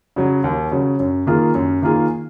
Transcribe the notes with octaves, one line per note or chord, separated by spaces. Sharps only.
C#3 F#3
D#2
C#3 F#3
F#2
D#3 A#3 F4 G#4
F#2
D#3 A#3 F4 G#4